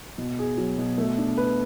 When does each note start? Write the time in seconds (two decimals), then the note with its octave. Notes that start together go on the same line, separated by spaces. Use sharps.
0.18 B2
0.39 G#4
0.57 F#3
0.78 B2
0.98 A3
1.18 D4
1.37 B4